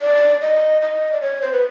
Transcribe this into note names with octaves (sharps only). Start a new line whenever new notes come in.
D5
D#5
D#5
D5
C#5
C5
B4